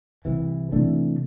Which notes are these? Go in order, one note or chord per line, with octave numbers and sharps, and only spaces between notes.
C2 C3 E3
C3 E3 A3 D4